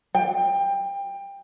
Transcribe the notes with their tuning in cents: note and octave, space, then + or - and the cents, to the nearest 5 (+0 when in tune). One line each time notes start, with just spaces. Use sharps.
G5 +20